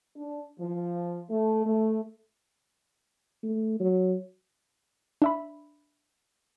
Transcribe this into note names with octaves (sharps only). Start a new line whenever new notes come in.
D4
F3
A3
A3
A3
F#3
D4 E5 B5